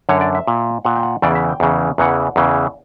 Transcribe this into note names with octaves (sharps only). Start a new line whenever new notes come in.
F#2 D3 C#5
D5
E5
A#2
A#2 F#5
G5
F#5
E2 C#3 E3 D5
E5
G5
E2 C#3 E3
E2 C#3 E3 F#5
E2 C#3 E3